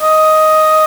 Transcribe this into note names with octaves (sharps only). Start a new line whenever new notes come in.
D#5